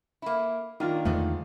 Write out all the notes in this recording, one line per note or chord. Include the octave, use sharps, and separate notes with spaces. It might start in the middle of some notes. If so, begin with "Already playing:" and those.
A#3 E4
D#3 A#3 D4 F4
E2 G#2 D3 G#3 A3